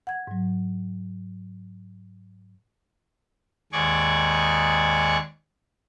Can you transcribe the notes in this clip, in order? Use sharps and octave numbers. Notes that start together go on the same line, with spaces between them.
F#5 G#6
G#2 F#3
D#2 G#2 G#4 D5 C#6